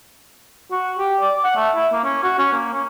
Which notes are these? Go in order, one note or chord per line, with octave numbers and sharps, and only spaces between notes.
F#4
G4
D5
F#5
A3
E4
A#3
C#4
F#4
C#4
A#3
C#4